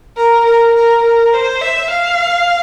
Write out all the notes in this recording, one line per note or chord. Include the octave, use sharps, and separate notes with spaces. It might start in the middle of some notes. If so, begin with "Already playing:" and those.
A#4
A#4
A#4
A#4
C5
E5
F5